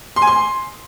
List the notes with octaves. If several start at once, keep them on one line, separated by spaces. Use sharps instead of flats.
C6
G#5
C6